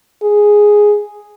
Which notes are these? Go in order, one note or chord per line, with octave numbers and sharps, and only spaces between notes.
G#4